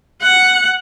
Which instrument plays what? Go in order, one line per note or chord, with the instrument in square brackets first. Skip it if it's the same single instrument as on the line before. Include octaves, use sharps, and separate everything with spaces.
[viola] F#5